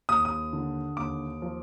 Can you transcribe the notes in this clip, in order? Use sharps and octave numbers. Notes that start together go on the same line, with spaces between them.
D#2 D#6
D#6
D3
D#2 D6
F3